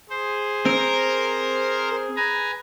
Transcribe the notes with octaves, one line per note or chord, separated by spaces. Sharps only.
G#4 C5
C4 A#4
B4 G#5 A#5